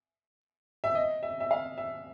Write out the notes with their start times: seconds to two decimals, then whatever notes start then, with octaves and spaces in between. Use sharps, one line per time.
0.84 E5
0.95 D#5
1.23 E5
1.40 E5
1.51 F5
1.78 E5